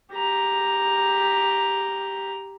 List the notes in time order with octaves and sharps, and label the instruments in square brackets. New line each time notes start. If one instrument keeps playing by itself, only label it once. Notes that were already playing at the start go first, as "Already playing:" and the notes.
[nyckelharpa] G4 A#5